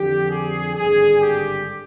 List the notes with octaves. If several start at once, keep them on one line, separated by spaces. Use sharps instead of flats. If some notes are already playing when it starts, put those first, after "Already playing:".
Already playing: F2 D3 F3 G4
G#4
G#1 G2 D3 G3 G#4
G4